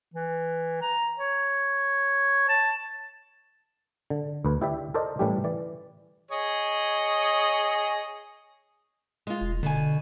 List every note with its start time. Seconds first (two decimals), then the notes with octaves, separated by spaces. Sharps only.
0.14 E3
0.82 A#5
1.18 C#5
2.49 A5
4.10 D3
4.45 D2 B4
4.61 E4 G4 D5 E5
4.94 A4 A#4 C5 D5 D#5
5.19 A2 E3 G3 A3 C#4 G4
5.44 E3 D5
6.31 G#4 C#5 D#5
9.27 G#3 F4
9.41 E1
9.63 B2 D3 G#5